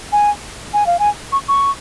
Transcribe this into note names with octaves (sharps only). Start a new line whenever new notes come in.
G#5
G#5
F5
G#5
C#6
C#6